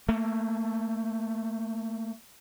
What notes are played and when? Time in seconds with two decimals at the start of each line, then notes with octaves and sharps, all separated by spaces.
0.09 A3 A#3